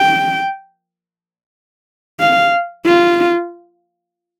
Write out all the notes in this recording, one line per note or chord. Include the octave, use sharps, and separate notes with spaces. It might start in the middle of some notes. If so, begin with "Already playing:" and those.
Already playing: G5
F5
F4